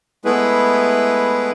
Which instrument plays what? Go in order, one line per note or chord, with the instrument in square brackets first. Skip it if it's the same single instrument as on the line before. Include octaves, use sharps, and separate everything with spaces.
[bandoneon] G#3 A3 B3 E4 G#4 B4